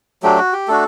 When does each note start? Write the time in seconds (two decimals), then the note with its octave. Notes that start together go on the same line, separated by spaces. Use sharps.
0.23 F#3 A3 D4 G4
0.38 F#4
0.53 G4
0.68 A3 D4 F#4 A4